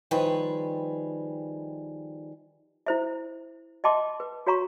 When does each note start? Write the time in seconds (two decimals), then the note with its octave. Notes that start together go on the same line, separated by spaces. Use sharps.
0.11 D#3 F3 G3 G#4 B4
2.86 E4 C5 E5
3.84 D#5 E5 G5 A5 C6 D6
4.20 B4
4.47 F#4 C#5 F5 A#5 C6 C#6